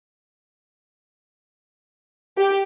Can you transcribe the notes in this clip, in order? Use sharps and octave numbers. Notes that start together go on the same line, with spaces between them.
G4